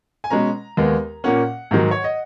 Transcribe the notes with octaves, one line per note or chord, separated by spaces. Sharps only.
G#5
B2 G#3 C#4 A#5
D#2 D#3 G#3 B3
A#2 A#3 C#4 F#5
G#2 D#3 F#3
C#5
D#5